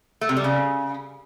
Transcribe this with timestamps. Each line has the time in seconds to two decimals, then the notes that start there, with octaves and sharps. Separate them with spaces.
0.21 A3
0.29 C3
0.37 G3
0.44 C#3